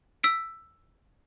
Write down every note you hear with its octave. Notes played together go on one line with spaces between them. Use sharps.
E6 B6 D7